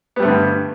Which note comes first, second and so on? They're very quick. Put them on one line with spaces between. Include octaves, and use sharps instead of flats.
B3 G3 A3 D3 G2